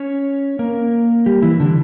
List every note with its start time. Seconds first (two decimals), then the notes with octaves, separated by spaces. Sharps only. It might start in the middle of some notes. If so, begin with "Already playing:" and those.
Already playing: C#4 C#5
0.59 A#3 A#4
1.26 G3 G4
1.42 E3 E4
1.60 D3 D4